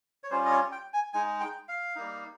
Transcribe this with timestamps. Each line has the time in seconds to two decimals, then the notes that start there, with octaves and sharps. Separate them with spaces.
0.23 C#5
0.31 G3 C#4 F4 C5
0.45 D#5
0.51 C#5
0.72 G5
0.93 G#5
1.13 G#3 D#4 G#5
1.40 G5
1.68 F5
1.96 G3 A#3 D#4